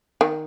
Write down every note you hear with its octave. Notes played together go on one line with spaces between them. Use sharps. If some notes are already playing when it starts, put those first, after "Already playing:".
D#3